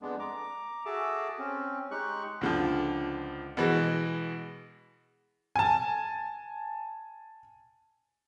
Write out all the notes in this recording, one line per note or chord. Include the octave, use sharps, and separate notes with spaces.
F2 G#3 B3 D4
A#5 D6
F#4 G#4 A4 E5 A5 D6
C4 C#4
G#3 D#4 G4 C#6 F#6
C#2 D3 F3
B2 E3 G#3
G#5 A5